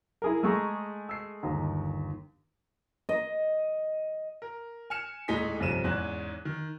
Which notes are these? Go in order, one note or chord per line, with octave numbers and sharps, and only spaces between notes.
E4 G#4 A#4
G#3 A3 G#4 A#5 C#6 E6
E6 C7
G1 D#2 A#5
D#5
A#4
G#5 F6 C#7 E7
D#1 A2 G#3 D#4 G#5 B6
B1 G2 C3 F3 D#7 E7
E2 G#2 C#4 F#6
D#3